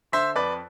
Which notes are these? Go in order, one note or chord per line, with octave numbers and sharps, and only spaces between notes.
D3 C5 E5
F2 B4 D5